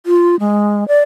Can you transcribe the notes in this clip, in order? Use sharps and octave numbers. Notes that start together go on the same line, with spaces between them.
F4
G#3
D5